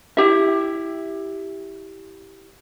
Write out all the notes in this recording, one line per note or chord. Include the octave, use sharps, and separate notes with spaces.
E4 G4 E5